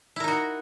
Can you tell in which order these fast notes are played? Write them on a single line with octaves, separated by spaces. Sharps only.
E4 A#4 D#4 F#4